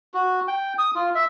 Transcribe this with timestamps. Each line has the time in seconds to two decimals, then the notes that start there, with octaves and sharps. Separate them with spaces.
0.14 F#4
0.48 G5
0.78 D#6
0.95 F4
1.15 E5